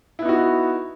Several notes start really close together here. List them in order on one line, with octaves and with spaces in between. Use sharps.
E4 B3 D#4 F#4